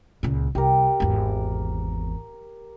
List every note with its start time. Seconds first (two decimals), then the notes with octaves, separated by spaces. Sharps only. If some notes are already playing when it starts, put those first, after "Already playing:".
0.23 C#2 A#2
0.55 C2 G4 A#4
1.00 G#1 E2